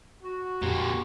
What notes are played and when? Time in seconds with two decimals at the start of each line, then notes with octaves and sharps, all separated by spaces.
0.23 F#4
0.62 F2 A#2 D3 G4